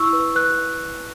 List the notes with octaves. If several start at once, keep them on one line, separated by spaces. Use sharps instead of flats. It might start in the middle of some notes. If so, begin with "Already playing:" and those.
Already playing: E4 C#6 E6
B4
B4 F#6